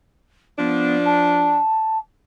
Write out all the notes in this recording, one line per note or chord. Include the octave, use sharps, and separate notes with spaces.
F3 B3 D4
A5